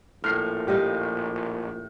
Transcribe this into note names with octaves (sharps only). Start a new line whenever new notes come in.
A#1 A2 F6 C7
G4 D#5 F5